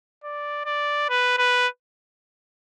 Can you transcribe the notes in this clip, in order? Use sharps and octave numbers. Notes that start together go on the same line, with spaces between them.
D5
D5
B4
B4